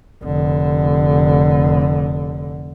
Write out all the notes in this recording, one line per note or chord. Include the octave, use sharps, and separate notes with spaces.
F1 D3